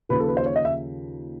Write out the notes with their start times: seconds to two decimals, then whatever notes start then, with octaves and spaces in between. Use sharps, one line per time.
0.09 D#2 C#3 F3 B4
0.19 A4
0.28 B4
0.37 C5
0.46 C#5
0.56 D#5
0.65 E5